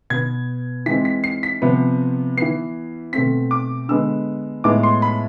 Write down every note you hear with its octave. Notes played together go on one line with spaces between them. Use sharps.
B2 B3 G#6
E3 G#3 C4 B6
B6
C7
B6
C3 F3 B3
E3 B3 C7
B2 A3 C4 B6
D6
D3 G#3 B3 E6
A2 G#3 B3 D6
C6
B5